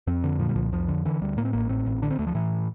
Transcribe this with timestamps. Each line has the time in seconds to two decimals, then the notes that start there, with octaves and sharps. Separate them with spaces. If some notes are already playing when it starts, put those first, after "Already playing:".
0.07 F2 C4
0.24 D3
0.39 A#2 F3
0.49 G3
0.55 C2 F3
0.72 F2 F3
0.88 D3
1.05 D3 E3
1.21 D2 G3
1.37 A2 A#3
1.45 C4
1.53 A1 A#3
1.69 A2 C4
1.86 A1
2.02 D3 D4
2.10 C4
2.19 D2 A3
2.27 F3
2.35 A2 E3